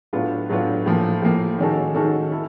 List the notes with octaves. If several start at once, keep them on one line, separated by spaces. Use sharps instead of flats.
A2 F#3 B3 D4 F4
A2 F#3 B3 D4 F4
A2 F3 A#3
A2 F3 A#3
D#3 G#3 C#4 F#4 A4
D#3 G#3 C#4 F#4 A4
E4 A4